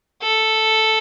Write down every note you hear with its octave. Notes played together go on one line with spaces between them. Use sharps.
A4